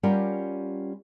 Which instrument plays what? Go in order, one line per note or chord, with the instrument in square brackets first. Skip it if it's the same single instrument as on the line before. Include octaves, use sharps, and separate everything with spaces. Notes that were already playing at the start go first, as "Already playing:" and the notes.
[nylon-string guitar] G3 C#4 F4 G4 A#4 F#5